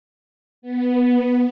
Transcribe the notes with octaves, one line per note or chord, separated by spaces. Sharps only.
B3